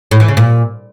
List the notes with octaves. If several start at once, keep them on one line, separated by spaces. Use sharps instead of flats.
A2
E3
C#3
A#2